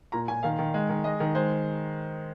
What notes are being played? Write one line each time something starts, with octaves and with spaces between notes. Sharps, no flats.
A#2 A#5
A#2 G#5
D#3 F5
D#3
G#3
D#3
G#3 D#5
D#3
G#3 C5